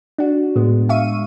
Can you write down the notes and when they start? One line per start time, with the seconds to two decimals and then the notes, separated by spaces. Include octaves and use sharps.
0.18 D4 F#4
0.56 A2 G#3 B3
0.89 E5 F5 C#6 D#7